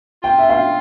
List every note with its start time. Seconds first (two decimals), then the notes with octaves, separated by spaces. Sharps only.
0.23 F4 G5
0.39 E5
0.49 F5